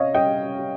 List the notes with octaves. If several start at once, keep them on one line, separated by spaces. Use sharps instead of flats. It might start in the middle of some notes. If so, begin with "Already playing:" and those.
Already playing: C3 C#4 C#5 D#5 F5
G3 D#5 G5
G3